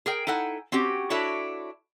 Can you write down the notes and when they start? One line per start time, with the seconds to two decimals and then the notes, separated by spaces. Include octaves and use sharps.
0.06 G#4 A#4 G5
0.27 D#4 E4 A4 F#5 G#5
0.72 C4 C#4 F#4 G4
1.10 D4 E4 F#4 A4 C#5 E5